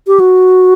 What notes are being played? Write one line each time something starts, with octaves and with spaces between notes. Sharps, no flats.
G4
F#4